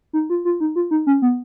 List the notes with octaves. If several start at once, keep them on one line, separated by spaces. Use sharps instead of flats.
D#4
F4
F4
D#4
F4
D#4
C#4
B3